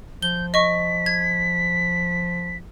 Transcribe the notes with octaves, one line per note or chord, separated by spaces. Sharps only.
F3 G6 G7
D#5 C#6 B6
G#6